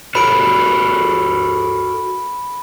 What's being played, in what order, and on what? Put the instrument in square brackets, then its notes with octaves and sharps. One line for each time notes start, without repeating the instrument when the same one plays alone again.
[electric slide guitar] F#4 A4 A#4 [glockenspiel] B5 D7